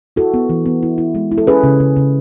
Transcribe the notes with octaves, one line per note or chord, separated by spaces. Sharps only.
E4 F#4 A4
B3
E3
B3
E4
E4
G#3
E4
A4
C#4 G#4 B4
C#3
C#3
C#3